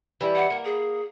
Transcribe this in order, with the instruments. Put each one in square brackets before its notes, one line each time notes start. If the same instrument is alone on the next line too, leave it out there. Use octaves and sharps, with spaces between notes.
[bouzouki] E3 G3 E4
[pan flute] F#5
[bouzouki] A#3 A#4
[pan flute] G#4